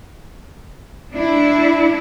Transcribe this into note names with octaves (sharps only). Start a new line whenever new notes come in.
D4 E4